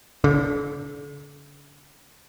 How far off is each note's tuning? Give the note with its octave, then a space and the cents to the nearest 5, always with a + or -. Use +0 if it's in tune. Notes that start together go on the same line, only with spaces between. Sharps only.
D3 -40